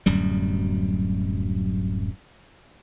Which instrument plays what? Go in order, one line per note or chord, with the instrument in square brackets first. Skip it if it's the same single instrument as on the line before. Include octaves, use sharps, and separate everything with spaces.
[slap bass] D1 F#2 G3